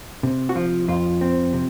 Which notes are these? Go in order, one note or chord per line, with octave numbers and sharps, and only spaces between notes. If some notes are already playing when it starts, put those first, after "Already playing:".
C3
F#4
F3 F4
F2 F4
C4
C3